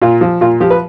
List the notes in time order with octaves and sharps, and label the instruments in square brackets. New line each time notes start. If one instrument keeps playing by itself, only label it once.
[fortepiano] A#2 F4
F3
A#2 F4
F3 G4
B4